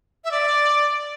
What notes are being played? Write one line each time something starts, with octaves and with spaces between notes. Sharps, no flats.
E5
D5